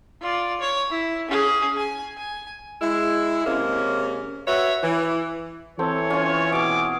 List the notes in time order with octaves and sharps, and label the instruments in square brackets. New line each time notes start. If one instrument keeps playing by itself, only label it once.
[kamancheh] F4 D5
C#5
E4
C#4 G#4
G#5
G#5
[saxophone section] G#3 E4
C3 G#3 A#3 C#4
F#4 B4 C#5 E5
E3
[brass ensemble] E3 [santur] C4 A4 [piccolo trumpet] C#5
[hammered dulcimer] C#4 F4 [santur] G#5
[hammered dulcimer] B2 G#4 [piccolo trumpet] D6